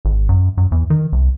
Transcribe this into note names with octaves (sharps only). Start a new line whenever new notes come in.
G#1
F#2
F#2
E2
D#3
C2